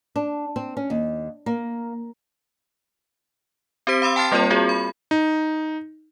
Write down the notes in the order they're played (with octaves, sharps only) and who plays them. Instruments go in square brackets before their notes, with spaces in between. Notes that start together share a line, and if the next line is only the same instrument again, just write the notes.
[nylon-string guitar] D4
C4
C#4
D#2
A#3
[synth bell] C4 G4 C5 B6 D7
F5 B5 C6 E6
G5 A5 C6 F6 A6 C7
G3 A#3 C4 F4 A#4 C#5
C4 F4 F#4 G#4
B5
[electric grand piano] D#4